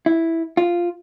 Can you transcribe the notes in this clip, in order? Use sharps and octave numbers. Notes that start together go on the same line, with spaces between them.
E4
F4